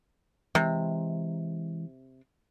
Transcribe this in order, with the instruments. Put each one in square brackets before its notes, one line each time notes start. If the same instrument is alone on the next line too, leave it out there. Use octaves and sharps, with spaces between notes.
[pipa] C3 [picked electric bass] E3 G#3